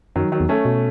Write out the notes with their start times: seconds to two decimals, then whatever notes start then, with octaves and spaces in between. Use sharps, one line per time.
0.16 F#2 D#3 F#3
0.32 D#3 F#3
0.40 E2
0.49 A3 C#4
0.65 B2